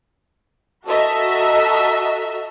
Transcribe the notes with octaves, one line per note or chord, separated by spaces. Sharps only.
F#4 A4 D#5 E5 A#5